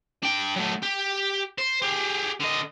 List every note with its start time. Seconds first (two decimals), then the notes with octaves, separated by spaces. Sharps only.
0.23 D4 G5
0.56 F#3 A3
0.83 G4
1.58 C5
1.82 G4 G#4
2.40 D3 D#5